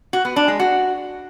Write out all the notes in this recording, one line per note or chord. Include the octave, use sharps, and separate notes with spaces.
F#4
B3
D4
G#3
F#4